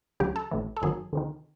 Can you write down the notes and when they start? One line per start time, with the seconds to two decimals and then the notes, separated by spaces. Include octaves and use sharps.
0.20 D2 C#3 F#3 G4
0.36 A4
0.51 A1 A2 E3
0.77 A4
0.82 G1 F#2 D#3 F#3 G#4
1.13 D2 C3 D#3